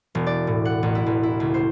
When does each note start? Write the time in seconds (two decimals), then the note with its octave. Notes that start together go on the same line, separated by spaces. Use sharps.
0.15 E1
0.27 D5
0.47 A2
0.65 F#5
0.83 A1
0.95 E4
1.06 A1
1.23 E4
1.40 C#2
1.54 C5